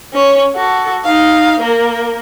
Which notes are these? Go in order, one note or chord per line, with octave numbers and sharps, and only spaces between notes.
C#4 C#5
F#4 A4
D#4 F5
A#3 A#4